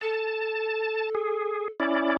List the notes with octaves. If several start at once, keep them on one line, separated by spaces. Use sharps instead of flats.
A4 A5
G#4
C#4 E4 D5